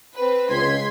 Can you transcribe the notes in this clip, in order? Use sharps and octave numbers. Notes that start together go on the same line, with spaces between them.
C4 B4
C#2 C6 G#6 B6